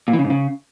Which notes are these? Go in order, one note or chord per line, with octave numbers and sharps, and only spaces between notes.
A#2
E3
C#3
G#2
C#3